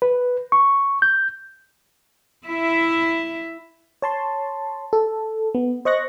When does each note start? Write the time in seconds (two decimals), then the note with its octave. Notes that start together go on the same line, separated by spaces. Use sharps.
0.02 B4
0.52 C#6
1.02 G6
2.47 E4 E5
4.02 C#5 A5 C6
4.93 A4
5.54 B3
5.85 C5 D#5 C#6 F#6 A#6